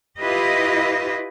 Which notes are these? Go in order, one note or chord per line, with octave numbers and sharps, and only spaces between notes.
E4 F4 G4 B4 D#5